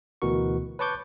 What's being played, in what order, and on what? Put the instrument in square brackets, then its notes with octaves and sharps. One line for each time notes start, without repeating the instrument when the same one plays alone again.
[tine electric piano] D2 B2 E3 F#4 A#4 C#6
B4 C#5 A5 C#6 D6 G6